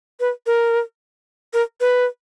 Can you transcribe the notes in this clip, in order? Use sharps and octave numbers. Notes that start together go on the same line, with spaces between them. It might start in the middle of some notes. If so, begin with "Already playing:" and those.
B4
A#4
A#4
B4